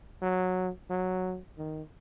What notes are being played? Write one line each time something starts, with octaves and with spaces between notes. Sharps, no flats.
F#3
F#3
D#3